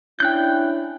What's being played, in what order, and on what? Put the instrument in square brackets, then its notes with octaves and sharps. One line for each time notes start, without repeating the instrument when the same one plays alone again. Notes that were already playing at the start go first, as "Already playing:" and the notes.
[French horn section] C#4 D4 E4 [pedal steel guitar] G5 F#6 G6